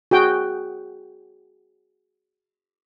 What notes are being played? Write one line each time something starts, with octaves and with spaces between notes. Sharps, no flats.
F#4 G#4 G5